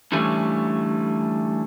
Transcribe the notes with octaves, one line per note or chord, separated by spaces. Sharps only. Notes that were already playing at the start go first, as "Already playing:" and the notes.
D3 E3 G3 A3 C#4